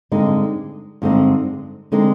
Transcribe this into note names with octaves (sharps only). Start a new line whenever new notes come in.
G2 D3 G#3 C4 D#4
G2 D3 G#3 C4 D#4
D3 G#3 C4 D#4